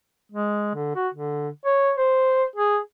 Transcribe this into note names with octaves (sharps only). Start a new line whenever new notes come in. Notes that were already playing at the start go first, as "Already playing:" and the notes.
G#3
D3
F#4
D3
C#5
C5
G#4